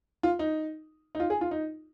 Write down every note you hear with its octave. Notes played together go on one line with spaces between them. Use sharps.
F4
D#4
D#4
F4
G#4
F4
D#4